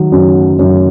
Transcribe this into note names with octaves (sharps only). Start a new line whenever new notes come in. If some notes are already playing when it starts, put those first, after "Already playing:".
Already playing: D#3 F#3
F#2
F#2